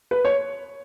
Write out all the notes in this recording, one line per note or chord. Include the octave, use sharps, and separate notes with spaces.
B4
C#5